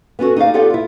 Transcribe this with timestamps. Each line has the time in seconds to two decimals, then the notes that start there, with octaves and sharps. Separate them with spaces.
0.19 B3 C#4 F4 F#4 A4
0.36 D#4 G#4 D5 F5
0.54 B3 F4 G4 A4 D5 F#5
0.70 E4 F4